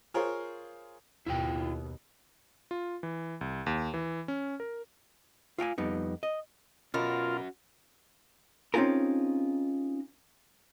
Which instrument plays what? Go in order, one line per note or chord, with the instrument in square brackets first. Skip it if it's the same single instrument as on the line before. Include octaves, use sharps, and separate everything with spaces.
[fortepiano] F4 G#4 A#4 C5 C#5
[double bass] D#2 B2 [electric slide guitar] E4 F4 G5
[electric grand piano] F4
E3
C2
D#2
E3
C#4
A#4
[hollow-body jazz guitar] F4 F5 G5 G#5
F2 G3 B3 D#4
D#5
[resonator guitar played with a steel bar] B2 A#4 [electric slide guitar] C#4 F#4 [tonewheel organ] F4
[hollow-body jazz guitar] C4 C#4 D#4 F4 G#4 A#4